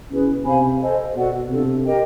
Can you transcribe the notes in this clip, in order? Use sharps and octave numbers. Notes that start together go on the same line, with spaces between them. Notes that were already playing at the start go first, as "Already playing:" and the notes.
B2 C#4 E4 G#4 B4
C3 C5 F5 G#5 B5
A4 C5 D#5 G#5
B2 F#4 A4 D5 F#5
C3 D4 F4 A4
G4 A#4 D#5 G5